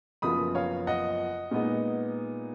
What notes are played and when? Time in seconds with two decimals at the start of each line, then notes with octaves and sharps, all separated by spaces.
0.22 F#1 F#2 F3 B3 F4 B5 D#6
0.55 C#5 F5
0.87 D#5 F#5
1.51 A#2 G#3 B3 D#4